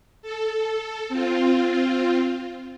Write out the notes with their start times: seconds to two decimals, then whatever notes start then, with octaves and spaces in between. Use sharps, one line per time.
0.22 A4
1.09 C4 F4